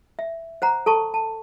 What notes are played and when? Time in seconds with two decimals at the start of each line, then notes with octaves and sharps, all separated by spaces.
0.19 E5
0.62 C5 F#5 A#5
0.86 A4 A5 C#6
1.14 A5